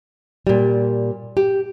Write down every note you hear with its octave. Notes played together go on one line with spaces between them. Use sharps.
A#2 G3
G4